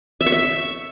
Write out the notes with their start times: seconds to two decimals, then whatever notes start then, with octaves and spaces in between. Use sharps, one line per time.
0.21 E5
0.26 C#6
0.32 E5